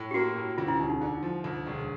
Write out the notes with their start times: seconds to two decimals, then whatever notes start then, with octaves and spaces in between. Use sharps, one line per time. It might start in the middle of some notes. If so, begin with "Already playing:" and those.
Already playing: A2
0.11 G4
0.14 A#3 F#4
0.36 A2
0.58 D2 F4
0.68 E4
0.80 E1 D#4
0.90 D#4
1.01 D3
1.23 F3
1.44 D2
1.66 E1